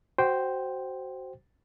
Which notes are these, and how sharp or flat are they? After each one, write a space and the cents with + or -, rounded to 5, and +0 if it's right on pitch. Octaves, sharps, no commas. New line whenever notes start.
F#4 +20 C5 +0 G5 +0